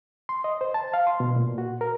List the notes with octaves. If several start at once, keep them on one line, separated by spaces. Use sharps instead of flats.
C6
D#5
C5
A5
F5
C6
B2
A#2
F#4
A#4